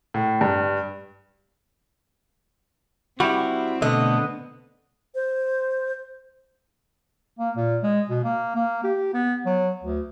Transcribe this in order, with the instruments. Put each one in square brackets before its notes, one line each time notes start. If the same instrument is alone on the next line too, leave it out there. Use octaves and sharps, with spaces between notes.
[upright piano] A2
G2
[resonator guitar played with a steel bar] G3 [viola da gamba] C4 [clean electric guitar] E4 F#4
[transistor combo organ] B2 A3 [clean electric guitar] D3 B3 [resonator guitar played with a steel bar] D#5
[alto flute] C5
[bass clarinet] A#3
A#2
G#3
B2
A#3
A#3
G4
B3
F#3
D2